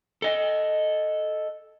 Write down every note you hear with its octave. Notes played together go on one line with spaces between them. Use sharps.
A4 D#5